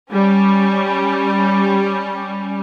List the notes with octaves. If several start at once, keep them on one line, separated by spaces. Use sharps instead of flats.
G3 C#4